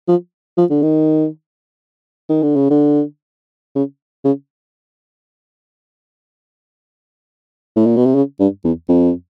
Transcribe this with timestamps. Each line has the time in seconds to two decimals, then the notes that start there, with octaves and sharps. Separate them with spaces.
0.08 F3
0.57 F3
0.70 D3
0.82 D#3
2.29 D#3
2.42 D3
2.56 C#3
2.70 D3
3.75 C#3
4.24 C#3
7.76 A2
7.86 A#2
7.96 B2
8.06 C3
8.15 C#3
8.39 G2
8.64 E2
8.89 F2